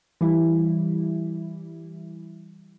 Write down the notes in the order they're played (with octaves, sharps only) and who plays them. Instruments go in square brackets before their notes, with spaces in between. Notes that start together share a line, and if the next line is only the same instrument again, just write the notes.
[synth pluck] E3 G3 E4